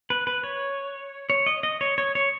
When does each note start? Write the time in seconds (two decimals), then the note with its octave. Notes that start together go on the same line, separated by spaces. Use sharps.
0.10 B4
0.27 B4
0.44 C#5
1.30 C#5
1.46 D#5
1.63 D#5
1.81 C#5
1.98 C#5
2.15 C#5